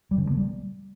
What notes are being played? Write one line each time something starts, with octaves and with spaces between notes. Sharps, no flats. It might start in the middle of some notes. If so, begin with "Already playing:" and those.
G3
C#3
E3
A#3
G3